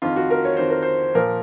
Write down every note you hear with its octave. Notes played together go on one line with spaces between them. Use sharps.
F2 D#3 F4
F#4
A#4
C#5
F2 D#3 C5
A#4
C5
A#2 F3 A#4